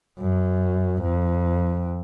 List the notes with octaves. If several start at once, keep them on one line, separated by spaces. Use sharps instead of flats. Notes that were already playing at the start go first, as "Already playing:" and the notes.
F#2
F2